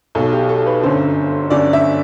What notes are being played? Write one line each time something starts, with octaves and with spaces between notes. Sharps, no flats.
B1 B2 A4
G4
A4
B4
G1 F#2 D3 C5
G1 F#2 D3 D5
E5